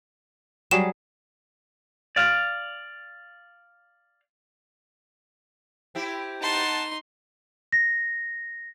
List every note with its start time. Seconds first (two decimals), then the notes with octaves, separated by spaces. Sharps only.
0.71 F#3 G3 G#4 E7
2.16 D5 F5
5.95 C4 E4 G4
6.41 D#4 F#5 A5 C6
7.72 A#6